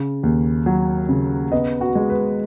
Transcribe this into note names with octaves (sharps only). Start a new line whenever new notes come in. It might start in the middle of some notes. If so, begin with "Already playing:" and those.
Already playing: C#3
D#2
F#3
C#3
B3 D#5
F#4
G#3
B4